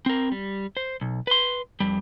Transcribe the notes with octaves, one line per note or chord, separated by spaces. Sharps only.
C4 A#4
G3
C5
B1
B4 C6
F2 G3